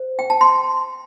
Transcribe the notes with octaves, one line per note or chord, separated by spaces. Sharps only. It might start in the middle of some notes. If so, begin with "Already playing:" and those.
Already playing: C5
G5
A5
C6